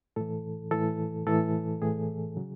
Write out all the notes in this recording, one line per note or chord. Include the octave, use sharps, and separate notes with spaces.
A2 E3 A4
A2 E3 A4
A2 E3 A4
A2 E3 G#4
C#3 F#3